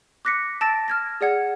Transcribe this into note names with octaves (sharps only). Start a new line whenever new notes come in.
D6 F#6 A#6 B6 C#7
A5 E6 A6 A#6 D7
F6 G#6 A#6
G#4 D5 F#5 G#6